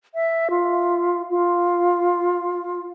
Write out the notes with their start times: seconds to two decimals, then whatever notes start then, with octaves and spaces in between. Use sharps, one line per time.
0.15 E5
0.50 F4
1.30 F4